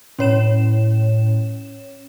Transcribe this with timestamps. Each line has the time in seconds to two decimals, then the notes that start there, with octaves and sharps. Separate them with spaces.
0.19 A2 C#4 C#5 E7